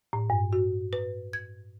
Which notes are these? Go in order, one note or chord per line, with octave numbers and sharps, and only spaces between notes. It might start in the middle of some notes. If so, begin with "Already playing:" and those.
A2
G2
F#4
B4
G#6